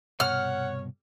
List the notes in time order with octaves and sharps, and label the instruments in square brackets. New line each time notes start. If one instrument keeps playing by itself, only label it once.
[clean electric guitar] C2 G2 B2 [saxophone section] C#5 [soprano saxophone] F#5 [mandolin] F6